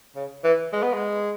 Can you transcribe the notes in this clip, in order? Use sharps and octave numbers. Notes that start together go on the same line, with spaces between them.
C#3
E3
G#3
B3
G#3